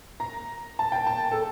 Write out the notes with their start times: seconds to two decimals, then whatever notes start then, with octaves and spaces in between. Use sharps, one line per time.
0.20 A#5
0.79 A5
0.92 G5
1.07 A5
1.31 A4